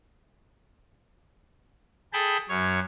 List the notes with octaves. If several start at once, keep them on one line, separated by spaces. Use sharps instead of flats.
G#4 A4 G5 A5 B5
F#2 C#5